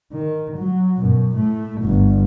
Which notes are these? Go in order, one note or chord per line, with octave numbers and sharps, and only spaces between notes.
D#3
F#3
F#2 B2
A2 A3
G1 G2